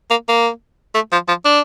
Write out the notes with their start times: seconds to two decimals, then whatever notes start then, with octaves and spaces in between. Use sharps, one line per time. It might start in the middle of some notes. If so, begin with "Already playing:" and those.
0.10 A#3
0.28 A#3
0.95 A3
1.12 F3
1.28 F3
1.45 D4